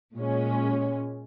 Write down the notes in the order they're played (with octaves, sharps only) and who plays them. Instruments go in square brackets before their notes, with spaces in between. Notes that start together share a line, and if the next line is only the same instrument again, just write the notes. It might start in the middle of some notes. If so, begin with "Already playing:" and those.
[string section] A#2 G#3 C#4